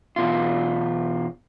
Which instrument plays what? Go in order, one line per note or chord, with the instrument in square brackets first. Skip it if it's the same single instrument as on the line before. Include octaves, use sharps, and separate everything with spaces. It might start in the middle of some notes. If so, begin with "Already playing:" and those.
[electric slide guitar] E2 B2 F4